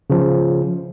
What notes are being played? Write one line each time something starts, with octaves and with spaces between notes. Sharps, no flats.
C#3 F3